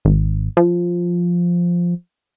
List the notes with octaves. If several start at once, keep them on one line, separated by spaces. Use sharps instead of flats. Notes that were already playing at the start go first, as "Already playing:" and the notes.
G#1
F3